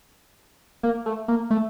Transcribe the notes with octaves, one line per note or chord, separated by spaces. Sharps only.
A#3
A3
A#3
A3